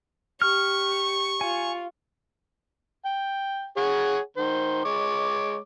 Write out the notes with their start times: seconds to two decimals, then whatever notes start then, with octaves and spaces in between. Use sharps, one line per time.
0.42 G4 C#6 F6
1.41 F4 G#5
3.05 G5
3.77 G#4 C#5 F#5
4.37 D#3 C5
4.85 G#3 C#5 D6